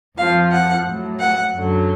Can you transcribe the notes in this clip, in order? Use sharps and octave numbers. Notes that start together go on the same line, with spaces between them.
F2 F3 F5
F#5
A2 F#3
F#5
F#2 D3 F#3